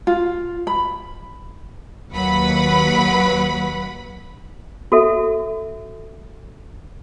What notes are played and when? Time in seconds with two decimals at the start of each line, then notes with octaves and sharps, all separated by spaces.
0.07 F4
0.67 B5
2.12 D#2 F#3 B4 F#5 B5
4.92 F#4 A4 E5